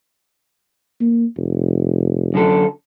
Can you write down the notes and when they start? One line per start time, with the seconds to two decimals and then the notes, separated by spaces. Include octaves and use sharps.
1.01 A#3
1.37 F1
2.34 F#2 D3 A4